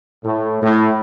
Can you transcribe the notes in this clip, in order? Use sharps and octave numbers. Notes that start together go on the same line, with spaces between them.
A2
A2